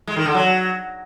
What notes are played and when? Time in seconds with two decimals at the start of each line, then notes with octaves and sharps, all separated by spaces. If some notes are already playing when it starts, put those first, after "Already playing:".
0.07 G#3
0.17 D#3
0.26 D3
0.35 F#3